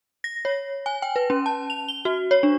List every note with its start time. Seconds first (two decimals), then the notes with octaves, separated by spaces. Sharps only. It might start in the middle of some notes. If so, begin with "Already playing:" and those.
0.24 A#6
0.45 C#5
0.86 G#5
1.02 G5
1.16 B4
1.30 C#4
1.46 A5
1.70 F7
1.88 G7
2.05 F#4
2.31 C#5
2.43 D4